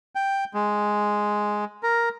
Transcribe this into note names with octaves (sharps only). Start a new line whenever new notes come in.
G5
G#3
A#4